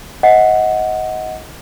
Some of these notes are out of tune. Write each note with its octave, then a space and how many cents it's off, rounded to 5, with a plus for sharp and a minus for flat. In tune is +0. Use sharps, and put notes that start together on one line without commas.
D#5 +25 F#5 +0